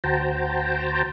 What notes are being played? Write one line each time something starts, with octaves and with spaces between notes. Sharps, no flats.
D2 F#4 C5 G5 A5 A#5